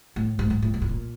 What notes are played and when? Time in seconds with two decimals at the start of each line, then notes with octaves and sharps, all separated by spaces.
0.16 A2
0.39 G#2
0.50 G#2
0.62 A2
0.74 A#2
0.82 A2
0.89 A#2